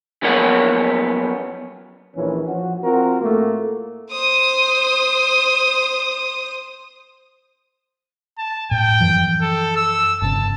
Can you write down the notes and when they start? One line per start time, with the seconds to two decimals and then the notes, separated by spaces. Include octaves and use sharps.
0.22 F#2 F3 A#3 B3 C#5 F#5
2.16 A#1 E3 C#4
2.47 F3 F#4
2.83 C4 F4 F#4 A#4
3.21 A2 A3 A#3
4.12 C5 D#6
8.38 A5
8.71 A2 G5
9.00 F#2 E3 F3
9.42 A4
9.76 E6
10.22 G1 C#3 A5